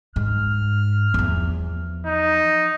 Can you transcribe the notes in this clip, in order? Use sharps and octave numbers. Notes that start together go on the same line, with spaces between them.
G#2 F6
E2 F3
D#4